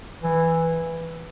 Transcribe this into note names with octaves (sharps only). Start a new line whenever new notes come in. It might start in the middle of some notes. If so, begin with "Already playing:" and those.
E3